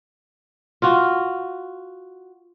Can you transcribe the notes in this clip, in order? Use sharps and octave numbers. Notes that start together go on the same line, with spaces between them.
F4 F#4